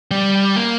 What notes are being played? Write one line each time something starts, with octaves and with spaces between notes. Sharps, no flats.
G3
A#3